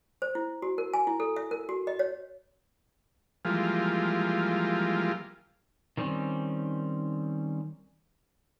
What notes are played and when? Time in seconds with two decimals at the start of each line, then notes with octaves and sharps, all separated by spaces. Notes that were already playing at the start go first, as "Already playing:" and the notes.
0.22 C5
0.35 E4
0.62 F#4
0.78 A#4
0.94 G#5
1.07 E4
1.20 A4
1.36 E5
1.51 A#4
1.69 F#4
1.87 D#5
1.99 C#5
3.45 E3 F3 G3 G#3 A#3 F4
5.97 D#3 G3 C4 C#4